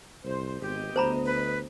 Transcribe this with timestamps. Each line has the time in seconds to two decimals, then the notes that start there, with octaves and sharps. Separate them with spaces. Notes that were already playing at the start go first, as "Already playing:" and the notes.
0.25 C2 C5
0.62 G#1 B3 G4 D#5
0.96 D2 C5 A#5 B5
1.26 B4